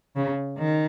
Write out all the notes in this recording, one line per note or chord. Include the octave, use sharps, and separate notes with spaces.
C#3
D#3